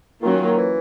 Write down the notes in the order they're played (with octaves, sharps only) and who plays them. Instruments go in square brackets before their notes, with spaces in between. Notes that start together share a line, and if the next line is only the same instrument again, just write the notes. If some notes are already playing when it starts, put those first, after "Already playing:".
[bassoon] D#3 [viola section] F#3 A#3 C#4 F4 A#4
[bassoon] E3